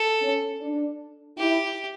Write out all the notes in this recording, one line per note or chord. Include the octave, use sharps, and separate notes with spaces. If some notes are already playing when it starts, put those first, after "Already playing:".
Already playing: A4
C#4
D4
E4 G4